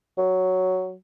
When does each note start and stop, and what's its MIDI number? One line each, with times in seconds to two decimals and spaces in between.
0.18 0.94 54